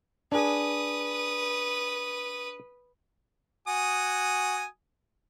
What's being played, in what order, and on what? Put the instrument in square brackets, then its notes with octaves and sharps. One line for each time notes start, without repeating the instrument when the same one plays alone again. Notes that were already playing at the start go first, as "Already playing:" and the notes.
[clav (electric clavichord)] D4 G#4 [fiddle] B4 D#6
[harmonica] F#4 G#5 D#6